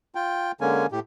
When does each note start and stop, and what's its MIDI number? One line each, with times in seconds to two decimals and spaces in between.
0.15 0.52 65
0.15 0.52 79
0.61 0.86 50
0.61 0.86 56
0.61 0.86 58
0.61 0.86 61
0.61 0.86 80
0.92 1.00 45
0.92 1.00 67